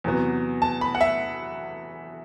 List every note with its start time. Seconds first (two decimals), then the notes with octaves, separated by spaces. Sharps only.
0.04 E2 C3 F#3 B3
0.62 A5
0.81 B5
0.95 F#5
1.01 E5